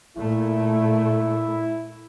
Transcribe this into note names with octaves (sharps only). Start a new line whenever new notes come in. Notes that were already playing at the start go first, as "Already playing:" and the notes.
A#2 A3 E4